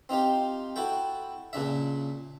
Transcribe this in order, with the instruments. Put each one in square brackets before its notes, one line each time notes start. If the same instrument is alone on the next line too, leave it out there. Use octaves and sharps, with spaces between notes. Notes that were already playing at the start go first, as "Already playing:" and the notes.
[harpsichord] C4 D#4 F4 G4
E4 F#4 A4 G5
A#2 C#3 D4 E5